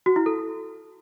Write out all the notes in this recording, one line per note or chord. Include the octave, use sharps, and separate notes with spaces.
F#4
E4
A4